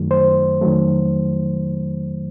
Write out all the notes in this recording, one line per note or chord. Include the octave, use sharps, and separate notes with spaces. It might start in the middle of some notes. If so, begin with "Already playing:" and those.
Already playing: F#2 D#3 F#3 A3
C5
F2 D#3 F#3 A3